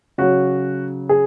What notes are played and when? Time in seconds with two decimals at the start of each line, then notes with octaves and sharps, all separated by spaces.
0.18 C#3 F#3 F#4
1.09 G#4